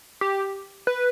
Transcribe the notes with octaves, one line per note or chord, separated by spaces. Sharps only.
G4
B4